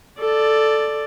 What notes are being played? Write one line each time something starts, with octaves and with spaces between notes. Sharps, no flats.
A4 D5